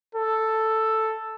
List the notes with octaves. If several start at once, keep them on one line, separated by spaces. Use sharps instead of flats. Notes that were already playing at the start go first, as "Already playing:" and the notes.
A4